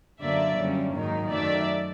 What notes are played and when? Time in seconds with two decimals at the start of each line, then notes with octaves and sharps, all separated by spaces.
0.20 F#2 D3 F#3 A#3 D5 E5
0.57 F#2 D3 G3 A#3 C#4
0.94 G#2 D#3 F#3 A#3 D#4
1.30 F#2 D#3 F#3 A3 D5 E5